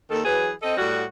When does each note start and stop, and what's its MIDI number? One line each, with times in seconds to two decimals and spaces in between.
0.09 0.21 39
0.09 0.21 51
0.09 0.21 69
0.25 0.51 52
0.25 0.51 54
0.25 0.51 68
0.25 0.51 71
0.62 0.77 60
0.62 0.77 69
0.62 0.77 75
0.77 1.03 45
0.77 1.03 55
0.77 1.03 66